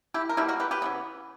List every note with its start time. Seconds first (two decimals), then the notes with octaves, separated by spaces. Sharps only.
0.14 E4 G4
0.29 A#4
0.37 B2 G3 A#3 E4 G4
0.48 F#4 A#4
0.60 G4 B4
0.71 G4 B4
0.82 C#3 E3 B3